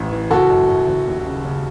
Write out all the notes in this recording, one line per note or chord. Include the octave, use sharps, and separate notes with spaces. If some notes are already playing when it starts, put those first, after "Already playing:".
Already playing: A1 A2 E3
E3
F#1 F#4 A4
F#2
F#2
F#1
D#2
C#3
C#3